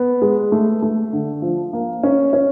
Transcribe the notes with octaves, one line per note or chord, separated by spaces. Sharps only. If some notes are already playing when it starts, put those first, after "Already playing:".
Already playing: B3
G#3
A3
A3
D3
F3
A#3
C#4
C#4